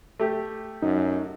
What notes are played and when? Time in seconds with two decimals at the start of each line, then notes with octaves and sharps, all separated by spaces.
0.20 A3 G4
0.82 F#2 D#4